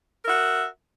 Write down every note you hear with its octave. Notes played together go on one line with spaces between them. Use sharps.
F#4 A#4 E5